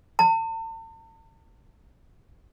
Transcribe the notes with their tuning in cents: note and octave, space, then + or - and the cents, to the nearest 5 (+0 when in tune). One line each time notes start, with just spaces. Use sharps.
A5 +45